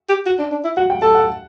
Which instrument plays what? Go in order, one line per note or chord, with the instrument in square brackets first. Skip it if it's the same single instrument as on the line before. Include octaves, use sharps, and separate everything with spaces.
[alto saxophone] G4
F#4
D4
D4
E4
[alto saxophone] F#4 [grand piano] F#5
[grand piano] G5
[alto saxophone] A4 [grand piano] A5
[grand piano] F#5